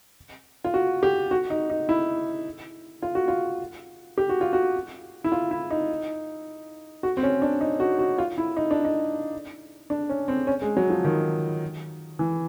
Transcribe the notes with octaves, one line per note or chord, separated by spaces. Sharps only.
F4
F#4
G4
F#4
D#4
D#4
E4
F4
F#4
F4
G4
F#4
F4
F#4
E4
F4
E4
D#4
F#4
C4
C#4
D4
D#4
F#4
F#4
F4
E4
D#4
D4
D#4
D4
C#4
C4
C#4
G#3
F#3
F3
D#3
E3